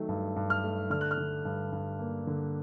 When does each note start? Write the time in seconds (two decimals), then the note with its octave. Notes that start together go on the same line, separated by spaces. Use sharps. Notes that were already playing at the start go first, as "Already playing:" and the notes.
Already playing: D#3 F#3 A3
0.09 G2
0.36 G2
0.50 F6
0.64 A3
0.90 D3 F6
1.01 F#6
1.11 F6
1.18 D3
1.45 G2
1.72 G2
1.99 A#3
2.27 D3